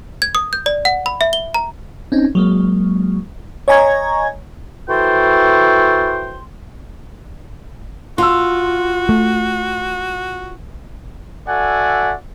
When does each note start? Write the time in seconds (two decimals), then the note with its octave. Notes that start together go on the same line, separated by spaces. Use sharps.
0.22 G#6
0.35 D#6
0.53 G6
0.66 D5
0.85 F#5
1.06 B5
1.21 E5
1.33 G7
1.54 A#5
2.12 C4 C#4 D#4
2.35 F#3 G#3 A#3
3.68 C#5 D#5 G#5 A#5 C#6 G#6
4.89 E3 F#4 A4 C5 G5 C6
8.18 F4 F#4 C6 E6
9.09 A3
11.48 F#4 A4 D5 E5 F#5 G#5